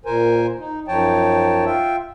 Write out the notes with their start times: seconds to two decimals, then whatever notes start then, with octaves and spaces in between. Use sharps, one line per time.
0.05 A#2 A#4 C5 G#5
0.59 D#4
0.88 F#2 F3 D#4 C#5 G5 A5
1.65 F4 E5 G5